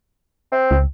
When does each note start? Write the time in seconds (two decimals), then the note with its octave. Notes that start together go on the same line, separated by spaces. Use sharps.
0.52 C4
0.71 C#2